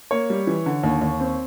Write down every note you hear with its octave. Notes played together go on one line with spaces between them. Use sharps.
A#3 C#5
G3
E3
D3
D#2
D#2
C4